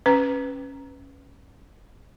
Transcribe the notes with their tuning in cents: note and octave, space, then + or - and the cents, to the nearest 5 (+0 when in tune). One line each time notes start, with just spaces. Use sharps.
C#4 -10 B4 +5 G5 +0